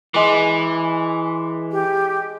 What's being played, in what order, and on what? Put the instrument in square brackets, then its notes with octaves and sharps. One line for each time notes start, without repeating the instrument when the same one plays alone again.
[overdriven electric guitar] E3 [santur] G#3 D5 D6
[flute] G4